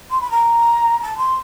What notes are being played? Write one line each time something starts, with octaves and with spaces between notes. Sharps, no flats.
C6
B5
A#5
A5
C6